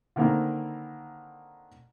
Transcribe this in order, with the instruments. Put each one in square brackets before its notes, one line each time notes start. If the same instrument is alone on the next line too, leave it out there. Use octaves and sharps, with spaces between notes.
[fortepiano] D3 D#3 A#3 C4 E4